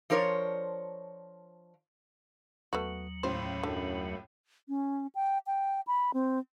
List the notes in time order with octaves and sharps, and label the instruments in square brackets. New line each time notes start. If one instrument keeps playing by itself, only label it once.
[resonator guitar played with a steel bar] F3 D4 A#4 C5 C#5
[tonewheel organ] D#2 F#3 [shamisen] A3 B3 F#4
[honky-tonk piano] C#2 A2 [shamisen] C5
[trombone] F#2 [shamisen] D3
[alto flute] C#4
G5
G5
B5
C4